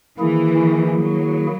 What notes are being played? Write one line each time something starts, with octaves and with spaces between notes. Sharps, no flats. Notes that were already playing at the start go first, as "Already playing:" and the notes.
D#3 E3 A#3 E4 G#4
F#3